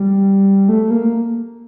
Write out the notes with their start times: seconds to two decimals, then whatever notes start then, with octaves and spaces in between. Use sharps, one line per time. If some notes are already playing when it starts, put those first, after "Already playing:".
Already playing: G3
0.69 A3
0.90 A#3